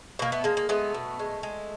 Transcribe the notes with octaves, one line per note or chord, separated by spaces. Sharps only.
B2 A#3
A3 B3
G#3 A#3
A#3
G#3 A3 B3
B2
G#3
G#3